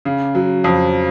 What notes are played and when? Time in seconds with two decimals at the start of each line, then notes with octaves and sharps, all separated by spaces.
0.05 C#3
0.35 F#3
0.64 F2